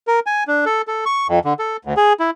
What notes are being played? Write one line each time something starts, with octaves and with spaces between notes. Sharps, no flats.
A#4
G#5
D4
A4
A4
C#6
F2
D3
A4
D2
G#4
E4